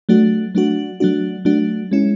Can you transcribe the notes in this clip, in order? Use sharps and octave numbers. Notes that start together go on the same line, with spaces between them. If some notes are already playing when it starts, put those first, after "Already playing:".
F#3 A3 D4 F#4
F#3 A3 D4 F#4
F#3 A3 D4 F#4
F#3 A3 D4 F#4
G#3 C#4 E4